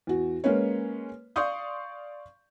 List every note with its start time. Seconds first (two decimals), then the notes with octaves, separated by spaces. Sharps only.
0.07 E2 F#4
0.44 G#3 A#3 C#4 B4 C#5
1.36 D5 F5 C6 C#6 D#6 G6